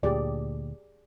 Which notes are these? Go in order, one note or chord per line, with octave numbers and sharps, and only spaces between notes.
D2 A#2 G4 G#4 D5